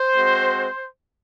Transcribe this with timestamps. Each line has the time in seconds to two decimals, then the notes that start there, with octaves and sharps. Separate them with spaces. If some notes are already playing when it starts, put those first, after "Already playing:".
Already playing: C5
0.16 G#3 C4 F#4